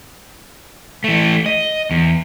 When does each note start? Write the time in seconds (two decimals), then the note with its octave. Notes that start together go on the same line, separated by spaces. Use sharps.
1.04 E3 A3
1.46 D#5
1.91 E2